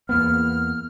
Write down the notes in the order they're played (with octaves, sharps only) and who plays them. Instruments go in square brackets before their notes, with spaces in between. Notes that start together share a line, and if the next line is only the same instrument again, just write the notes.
[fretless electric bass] E2 A#3 B3 [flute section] F6